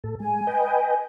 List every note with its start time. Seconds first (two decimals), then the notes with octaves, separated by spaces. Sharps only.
0.04 A2 A4
0.20 G#3 G#5
0.47 B4 D#5 G5